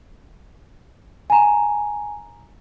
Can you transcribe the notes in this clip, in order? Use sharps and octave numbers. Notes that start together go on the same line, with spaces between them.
G#5 A#5